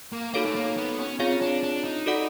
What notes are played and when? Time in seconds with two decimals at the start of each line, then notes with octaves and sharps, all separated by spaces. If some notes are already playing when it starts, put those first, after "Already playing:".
0.12 A#3
0.34 A#3 D#4 F#4 A4 C#5 F5
0.46 A3
0.55 A#3
0.77 B3
0.99 C#4
1.19 C4 C#4 F4 G#4 C#5 F5
1.42 D4
1.63 D4
1.84 D#4
2.06 F#4 A4 D5 F#5